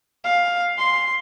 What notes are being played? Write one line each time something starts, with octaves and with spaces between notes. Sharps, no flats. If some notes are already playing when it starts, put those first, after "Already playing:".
F5
C6